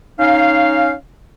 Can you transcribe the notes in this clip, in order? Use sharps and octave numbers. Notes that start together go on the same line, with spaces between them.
C#4 D#4 F5